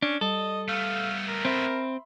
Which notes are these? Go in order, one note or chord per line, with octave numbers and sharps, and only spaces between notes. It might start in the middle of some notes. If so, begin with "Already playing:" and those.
C#4 D4
G3 A4 D#5
A3 B3 F5
A#4
C4 E5 B5 C6